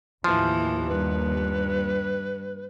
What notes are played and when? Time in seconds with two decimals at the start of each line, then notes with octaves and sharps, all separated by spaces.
0.24 D#2 A2 E3 F3
0.88 G2 B4